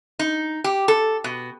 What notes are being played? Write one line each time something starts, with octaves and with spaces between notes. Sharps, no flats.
D#4
G4
A4
B2